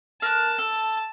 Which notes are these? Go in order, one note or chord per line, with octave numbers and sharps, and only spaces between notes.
A#4 A5 F#6
A4